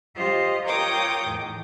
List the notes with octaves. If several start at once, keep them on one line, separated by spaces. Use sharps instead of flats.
F4 G4 C5 D#5
F4 A#4 C#5 G5 D6 D#6
E2 A2 D#3